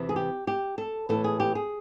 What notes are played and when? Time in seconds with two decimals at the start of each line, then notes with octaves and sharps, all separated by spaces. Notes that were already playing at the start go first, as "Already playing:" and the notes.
Already playing: E2 C3 E3
0.09 G#4
0.16 G4
0.47 G4
0.78 A4
1.09 A2 E3 A4
1.24 G#4
1.40 G4
1.55 G#4